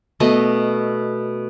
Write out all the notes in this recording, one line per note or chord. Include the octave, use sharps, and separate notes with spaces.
B2 A3 D#5